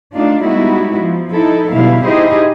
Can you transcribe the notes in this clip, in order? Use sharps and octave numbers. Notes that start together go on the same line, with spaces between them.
A3 D4 D#4 F4
G3 G#3 B3 D#4 E4 F#4
F3
D#4 E4 A4
B2 D3 F#3 G3 E4 F5
D#4 E4 G4 G#4 C5 D#5